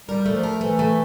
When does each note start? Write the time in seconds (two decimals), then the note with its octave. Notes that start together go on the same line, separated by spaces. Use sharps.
0.08 G3 A#4
0.26 A3
0.32 F3
0.43 A#4
0.56 E3
0.61 A3
0.79 A3